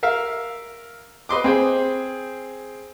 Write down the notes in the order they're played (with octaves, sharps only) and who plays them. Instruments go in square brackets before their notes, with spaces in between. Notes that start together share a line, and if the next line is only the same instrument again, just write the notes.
[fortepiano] A#4 E5 F5
B4 D#5 C6 D6
C4 G#4 C5